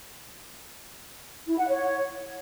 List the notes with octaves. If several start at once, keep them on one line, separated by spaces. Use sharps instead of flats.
E4
F#5
C#5